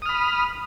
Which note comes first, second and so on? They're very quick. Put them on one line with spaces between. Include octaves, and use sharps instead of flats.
D#6 F6 B5